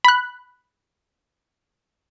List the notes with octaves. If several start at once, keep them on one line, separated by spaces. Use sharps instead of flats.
B5 F#6